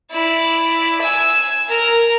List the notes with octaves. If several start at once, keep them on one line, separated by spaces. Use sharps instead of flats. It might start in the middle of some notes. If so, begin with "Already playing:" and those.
E4 D5
G#5 E6
A#4 A#5